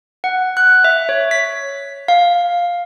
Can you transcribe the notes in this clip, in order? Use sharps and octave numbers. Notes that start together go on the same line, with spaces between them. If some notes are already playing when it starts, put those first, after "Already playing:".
F#5
F#6
E5
C#5
B6
F5